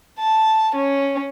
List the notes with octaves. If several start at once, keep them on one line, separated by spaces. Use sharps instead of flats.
A5
C#4